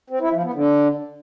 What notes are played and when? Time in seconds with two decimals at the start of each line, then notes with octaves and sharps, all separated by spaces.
0.10 C4
0.21 E4
0.32 F3
0.43 B3
0.54 D3